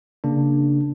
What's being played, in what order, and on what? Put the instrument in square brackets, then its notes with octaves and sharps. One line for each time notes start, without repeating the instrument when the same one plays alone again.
[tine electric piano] C#3 A#3 D4